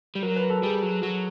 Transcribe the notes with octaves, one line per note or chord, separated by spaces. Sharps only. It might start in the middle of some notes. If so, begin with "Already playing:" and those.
G3
F#3 A#4
B4
A4
G3 G#4
F#3
F#3